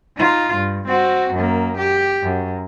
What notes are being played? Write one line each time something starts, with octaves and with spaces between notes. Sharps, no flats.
D#4 F4
G2
C4 F#4
F#2 A#3
G4
F#2